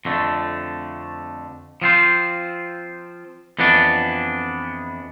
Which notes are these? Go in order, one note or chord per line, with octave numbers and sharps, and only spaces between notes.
F2 D3 A3
F3 C4 F4 C5
F2 E3 B3 D4